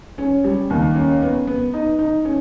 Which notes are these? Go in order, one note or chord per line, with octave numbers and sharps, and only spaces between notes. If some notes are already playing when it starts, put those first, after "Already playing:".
C#4
G3
D#2
C#4
B3
B3
D#4
D#4
C#4